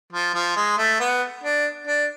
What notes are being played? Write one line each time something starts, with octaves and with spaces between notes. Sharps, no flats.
F3
F3
G#3
A3
B3
D4
D4